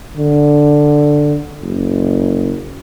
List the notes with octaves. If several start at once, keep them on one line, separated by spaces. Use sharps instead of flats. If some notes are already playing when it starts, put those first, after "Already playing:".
D3
F#1